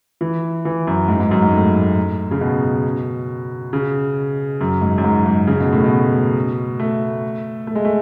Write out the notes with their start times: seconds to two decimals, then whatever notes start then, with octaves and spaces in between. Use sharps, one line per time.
0.21 E3
0.65 E3
0.87 F#2
1.08 G#2
1.20 G#2
1.31 F#2
1.42 G#2
1.53 A2
2.31 C#3
2.41 B2
3.73 C#3
4.61 F#2
4.81 G#2
4.98 F#2
5.04 G#2
5.26 G#2
5.47 C#3
5.61 B2
5.72 A2
5.84 B2
6.80 A3
7.67 A3
7.75 G#3
7.85 A3